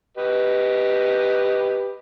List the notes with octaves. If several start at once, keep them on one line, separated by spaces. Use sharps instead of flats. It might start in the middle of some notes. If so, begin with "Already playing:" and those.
G4 B4 D#5